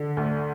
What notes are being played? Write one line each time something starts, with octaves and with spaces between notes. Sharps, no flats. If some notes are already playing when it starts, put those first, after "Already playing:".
Already playing: D3
D2